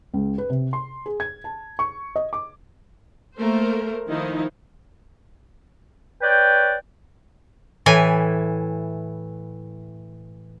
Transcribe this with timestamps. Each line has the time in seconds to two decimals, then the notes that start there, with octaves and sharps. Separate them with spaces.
0.14 C#2
0.38 B4
0.50 C3
0.73 C6
1.06 G#4
1.20 G#6
1.44 A5
1.79 C#6
2.16 D#5
2.33 D6
3.37 A3 A#3 A#4 C5
4.08 D#3 F3 D#4 E4
6.22 B4 C#5 D5 G5
7.86 A2 E3 G#5